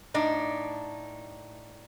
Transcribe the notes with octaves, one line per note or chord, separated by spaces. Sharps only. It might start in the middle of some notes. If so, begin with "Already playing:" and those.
A2 D4 D#4